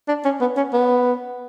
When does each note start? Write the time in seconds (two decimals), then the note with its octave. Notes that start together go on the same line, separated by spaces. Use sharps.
0.08 D4
0.25 C#4
0.41 B3
0.57 C#4
0.74 B3